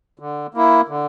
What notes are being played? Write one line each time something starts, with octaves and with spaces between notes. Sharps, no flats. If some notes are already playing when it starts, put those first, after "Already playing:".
D3
A#3 E4
D3